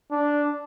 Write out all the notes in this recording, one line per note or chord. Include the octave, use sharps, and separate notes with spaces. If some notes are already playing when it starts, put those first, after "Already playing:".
D4